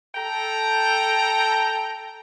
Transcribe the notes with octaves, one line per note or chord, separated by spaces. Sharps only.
A4 G5 A#5